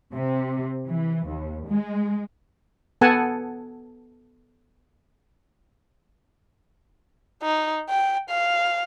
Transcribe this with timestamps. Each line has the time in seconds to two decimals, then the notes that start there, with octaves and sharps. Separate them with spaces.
0.13 C3
0.87 E3
1.28 D#2
1.67 G#3
3.01 B3 A4 F#5 G#5 A5
7.43 D#4
7.89 G5
8.30 F5